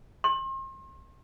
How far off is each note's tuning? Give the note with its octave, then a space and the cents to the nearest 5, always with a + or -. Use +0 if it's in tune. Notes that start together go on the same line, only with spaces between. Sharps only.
C6 +40